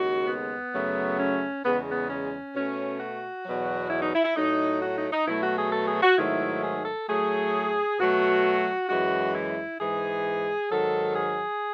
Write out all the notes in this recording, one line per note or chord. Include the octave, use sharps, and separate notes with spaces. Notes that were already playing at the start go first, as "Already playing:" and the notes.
Already playing: D#2 C#3 G#3 F#4
B3
F#2 C#3 F#3 A3
C#4
E2 C#3 G#3 B3
B3
C#4
B2 A3 C#4
F#4
E2 B2 F#3
E4
D#4
E4
E4
A2 F#3 A3 D#4
F#4
D#4
D#4
B2 F#3 A3 E4
F#4
G#4
A4
G#4
F#4
G#2 D#3 F#3 A3 E4
G#4
A4
A2 F#3 A3 G#4
B2 F#3 A3 F#4
F#2 E3 G#3 F#4
E4
G#2 E3 G#3 G#4
G#2 D#3 F#3 A4
G#4